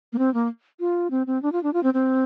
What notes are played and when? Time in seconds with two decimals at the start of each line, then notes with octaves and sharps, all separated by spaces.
0.13 A#3
0.18 C4
0.34 A#3
0.80 F4
1.11 C4
1.27 C4
1.43 D4
1.52 F4
1.63 D4
1.73 F4
1.83 C4
1.94 C4